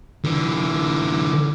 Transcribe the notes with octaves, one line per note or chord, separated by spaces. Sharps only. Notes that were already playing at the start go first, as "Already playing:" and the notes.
D3 E3